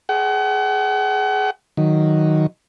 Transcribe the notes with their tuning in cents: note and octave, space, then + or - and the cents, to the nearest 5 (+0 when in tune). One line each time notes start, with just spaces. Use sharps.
G#4 +20 F#5 +40
D#3 +0 F#3 +0